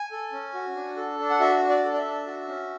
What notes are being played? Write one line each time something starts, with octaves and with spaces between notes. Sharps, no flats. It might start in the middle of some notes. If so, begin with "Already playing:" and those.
Already playing: G#5
A4
C#4
F#4
D4
A4
D4
F#5
F#4 E5
D4
D5
A4
D5
E5
D4
F#4
C#4